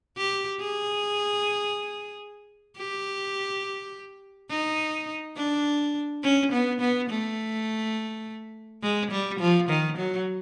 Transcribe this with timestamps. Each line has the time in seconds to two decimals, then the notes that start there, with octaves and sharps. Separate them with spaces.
0.17 G4
0.60 G#4
2.78 G4
4.50 D#4
5.37 D4
6.23 C#4
6.52 B3
6.81 B3
7.10 A3
8.83 G#3
9.11 G3
9.40 F3
9.69 D#3
9.97 F#3